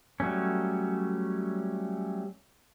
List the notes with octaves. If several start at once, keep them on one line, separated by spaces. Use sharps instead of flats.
F#3 G3 A3 C#4